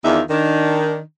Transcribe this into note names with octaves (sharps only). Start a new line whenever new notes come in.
E2 D#3 D4 D#4 F4 E5
D#3 D4